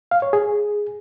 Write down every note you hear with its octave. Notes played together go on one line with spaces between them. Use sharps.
F5
C#5
G#4